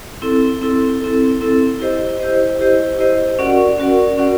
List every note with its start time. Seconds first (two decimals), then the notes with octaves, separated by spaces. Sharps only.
0.22 C4 E4 A4
0.62 C4 E4 A4
1.01 C4 E4 A4
1.41 C4 E4 A4
1.80 E4 G4 C5 D#5
2.20 E4 G4 C5 D#5
2.59 E4 G4 C5 D#5
2.99 E4 G4 C5 D#5
3.39 C#4 F#4 A#4 D5 F#5
3.78 C#4 F#4 A#4 D5 F#5
4.18 C#4 F#4 A#4 D5 F#5